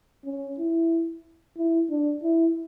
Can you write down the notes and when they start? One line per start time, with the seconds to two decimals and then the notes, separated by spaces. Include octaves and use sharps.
0.24 C#4
0.58 E4
1.57 E4
1.90 D4
2.23 E4